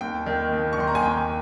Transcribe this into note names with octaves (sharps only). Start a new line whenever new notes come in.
D#2 G5
D#3
D#2
C#6
D#3 C6
A#5
G#5
D#2 G5